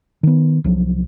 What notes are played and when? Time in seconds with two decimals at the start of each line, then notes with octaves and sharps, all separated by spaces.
0.23 D#3 B3
0.64 C2 F3 F#3